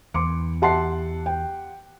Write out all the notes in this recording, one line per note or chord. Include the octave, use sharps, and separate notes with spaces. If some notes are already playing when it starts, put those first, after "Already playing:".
E2 C6 D6 C#7
G4 E5 F#5 A5 C6 C7
G5